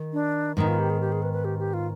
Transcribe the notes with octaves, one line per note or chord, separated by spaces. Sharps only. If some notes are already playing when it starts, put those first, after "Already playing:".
Already playing: D#3
D4
G#2 D#3 B3 D#4
F4
G4
G#4
G4
G#4
B4
B4
G4
G4
F4